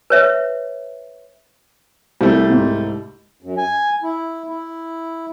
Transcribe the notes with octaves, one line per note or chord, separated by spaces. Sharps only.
B4 C#5 E5
C2 G3 A3
C2 G#2
F#2
G#5
E4
E4